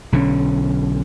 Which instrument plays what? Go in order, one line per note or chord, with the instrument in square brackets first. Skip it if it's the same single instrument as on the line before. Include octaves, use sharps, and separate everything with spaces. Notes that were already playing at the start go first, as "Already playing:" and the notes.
[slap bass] B1 D3 F3 C#4